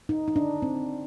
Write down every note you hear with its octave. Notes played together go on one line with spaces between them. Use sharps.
D#4
D#4
D4
C4